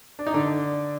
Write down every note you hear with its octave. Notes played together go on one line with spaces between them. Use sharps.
D4
D#4
D3 D4